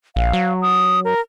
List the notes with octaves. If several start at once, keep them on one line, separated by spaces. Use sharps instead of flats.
A#1 F5
F#3
D#6
A#4